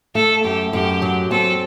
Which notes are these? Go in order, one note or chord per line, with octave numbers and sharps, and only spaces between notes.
A3 A4
F#2 G4
F#2 G4
F#3
C4 A4